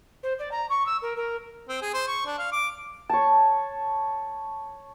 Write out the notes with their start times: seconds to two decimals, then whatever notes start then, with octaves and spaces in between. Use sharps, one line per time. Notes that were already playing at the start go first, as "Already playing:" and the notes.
0.23 C5
0.39 D5
0.51 A#5
0.69 C#6
0.86 E6
1.02 A#4
1.16 A#4
1.69 C4
1.82 G#4
1.94 C5
2.08 C#6
2.26 D4
2.39 F5
2.52 D6
3.10 C#5 A5